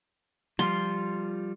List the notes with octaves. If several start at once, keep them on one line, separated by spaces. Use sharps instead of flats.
F3 G3 F4 C6